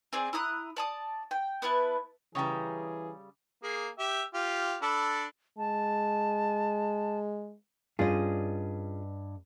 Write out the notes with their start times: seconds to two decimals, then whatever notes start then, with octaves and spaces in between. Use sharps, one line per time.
0.13 C4 G#4 D5
0.33 E4 A#5 D#6 F#6
0.77 D5 A5 D#6
1.31 G5
1.62 B3 E4 B4 A5
2.35 C#3 E3 G3 G#4 C#5 G5 A#5
3.63 A#3 G#4
3.99 G4 E5
4.34 F4 G4
4.82 D4 A4 B5
5.58 G#3 A5
7.99 G2 C#4 F4 G#4 D#5